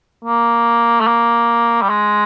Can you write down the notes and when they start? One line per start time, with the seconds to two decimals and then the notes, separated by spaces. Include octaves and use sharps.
0.25 A#3
1.00 A3
1.07 A#3
1.82 G3
1.89 G#3